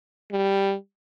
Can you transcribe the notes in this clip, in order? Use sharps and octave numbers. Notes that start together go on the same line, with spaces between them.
G3